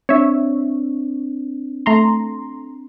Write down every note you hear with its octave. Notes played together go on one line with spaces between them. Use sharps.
C4 D4 C#5 E5
A3 A#5 C6